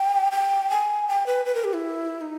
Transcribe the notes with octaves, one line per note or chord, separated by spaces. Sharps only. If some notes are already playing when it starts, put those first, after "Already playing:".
Already playing: G5
G5
G#5
G5
B4
B4
A#4
G4
E4
D#4